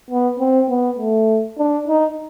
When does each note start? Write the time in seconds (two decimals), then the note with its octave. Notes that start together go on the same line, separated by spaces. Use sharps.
0.10 B3
0.40 C4
0.69 B3
0.99 A3
1.58 D4
1.88 D#4